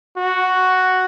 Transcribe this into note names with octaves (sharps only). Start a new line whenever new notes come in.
F#4